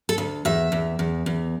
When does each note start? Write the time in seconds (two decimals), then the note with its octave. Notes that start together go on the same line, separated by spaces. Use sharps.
0.09 A4
0.18 D2
0.45 E2 E5
0.72 E2
0.99 E2
1.26 E2